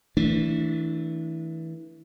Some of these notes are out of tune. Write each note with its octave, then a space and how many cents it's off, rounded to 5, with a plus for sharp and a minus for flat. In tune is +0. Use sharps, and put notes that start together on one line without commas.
E3 -25 A3 +15 D4 -15